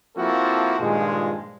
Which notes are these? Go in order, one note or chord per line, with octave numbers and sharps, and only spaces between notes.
F3 A#3 C4 E4 F#4 A4
G2 A#2 D#3 F3 G#3